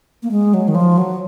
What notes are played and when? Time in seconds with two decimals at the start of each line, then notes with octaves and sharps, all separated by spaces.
0.23 A#3
0.31 G#3
0.54 F#3
0.68 D#3
0.75 F3
0.98 F#3